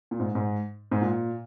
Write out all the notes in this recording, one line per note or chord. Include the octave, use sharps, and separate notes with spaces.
A#2
G#2
G#2
G#2
A#2